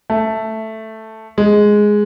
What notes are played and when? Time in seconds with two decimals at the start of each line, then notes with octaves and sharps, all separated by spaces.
0.10 A3
1.38 G#3